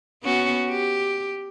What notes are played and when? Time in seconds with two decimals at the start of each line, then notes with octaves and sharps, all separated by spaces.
0.23 B3 C#4 F#4
0.70 G4